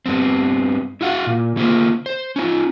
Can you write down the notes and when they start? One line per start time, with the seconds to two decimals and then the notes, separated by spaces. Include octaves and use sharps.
0.06 G2 B3 C4
1.01 E4 F#4 F5 F#5
1.26 A#2
1.56 C#3 A#3 F4 C5
2.06 C5
2.36 C#4 D#4 F4